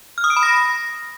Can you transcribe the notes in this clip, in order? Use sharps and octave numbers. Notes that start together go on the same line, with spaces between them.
F6
D#6
D7
B5
A#6